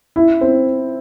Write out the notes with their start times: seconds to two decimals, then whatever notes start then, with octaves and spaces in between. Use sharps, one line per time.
0.16 E4
0.41 C4